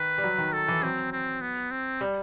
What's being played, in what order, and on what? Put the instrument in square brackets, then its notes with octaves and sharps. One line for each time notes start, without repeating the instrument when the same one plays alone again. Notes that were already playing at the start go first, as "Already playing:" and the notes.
Already playing: [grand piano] D#3 [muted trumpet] B4
[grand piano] G3
F#3
D#3
[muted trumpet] A4
[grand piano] E3
[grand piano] F#3 [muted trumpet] C4
[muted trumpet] C4
B3
C4
[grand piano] G3